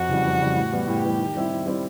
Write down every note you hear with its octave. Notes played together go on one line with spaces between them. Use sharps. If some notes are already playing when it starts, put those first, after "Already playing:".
Already playing: F2 F#4
C#3 E3 G3
F2
C#3 E3 G3
A2
E3 G3 B3
A2 G4
E3 G3 B3
D#3
G3 C4 E4
D#3
G3 C4 E4